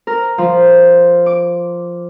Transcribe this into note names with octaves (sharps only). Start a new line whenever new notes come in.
A#4
F3
D6